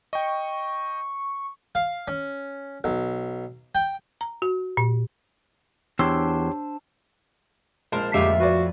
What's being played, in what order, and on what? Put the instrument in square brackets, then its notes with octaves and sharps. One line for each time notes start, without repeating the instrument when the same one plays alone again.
[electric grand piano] D#5 G5 [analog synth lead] C#6
[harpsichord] F5
C#4
B1
G5
[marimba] A#5
F#4
A#2
[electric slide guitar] E2 [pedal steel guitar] D4 C5 E6 [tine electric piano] G4 C#5 C6
[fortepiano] A#1 G#3 [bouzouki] A#4 C5 A5
[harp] F2 [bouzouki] A2 F4 E5 [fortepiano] D3 G#3 A#3 [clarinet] G4
[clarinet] F#4 [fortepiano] B4 D5